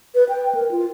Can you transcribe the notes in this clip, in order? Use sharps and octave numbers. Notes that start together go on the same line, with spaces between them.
B4
G5
A#4
F4